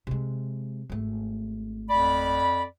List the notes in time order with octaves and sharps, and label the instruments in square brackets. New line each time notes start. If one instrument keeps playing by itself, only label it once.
[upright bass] C3 G#3
G#1 A3
[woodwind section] F2 D5 B5